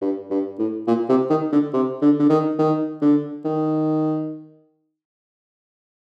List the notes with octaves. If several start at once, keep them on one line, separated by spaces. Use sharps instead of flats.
G2
G2
A2
A#2
C3
D#3
D3
C3
D3
D3
D#3
D#3
D3
D#3